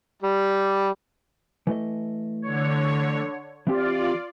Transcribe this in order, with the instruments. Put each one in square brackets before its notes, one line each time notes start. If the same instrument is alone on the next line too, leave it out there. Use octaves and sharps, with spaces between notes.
[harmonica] G3
[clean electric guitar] E3 A3 D#5
[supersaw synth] D3 C#5
[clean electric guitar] E3 C4 G4 [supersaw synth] F4 D5